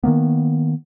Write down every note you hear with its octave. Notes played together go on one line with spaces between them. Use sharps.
D#3 F#3 A#3 B3